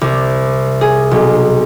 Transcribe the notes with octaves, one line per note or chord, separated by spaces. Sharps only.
C2
G#4
B1